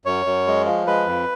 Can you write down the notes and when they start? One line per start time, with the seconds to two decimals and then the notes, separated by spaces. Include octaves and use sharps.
0.06 F#2 C#5
0.26 F#2
0.47 G#3
0.66 F3
0.87 G#3 B4
1.06 F2